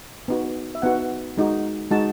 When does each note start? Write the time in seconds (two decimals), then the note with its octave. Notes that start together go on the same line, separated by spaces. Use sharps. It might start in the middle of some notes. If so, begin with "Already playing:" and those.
0.28 B3 D#4 F#4
0.75 E5
0.82 B3 D#4 F#4 F#5
1.37 G#3 D#4 F#4
1.91 G#3 D#4 F#4 A5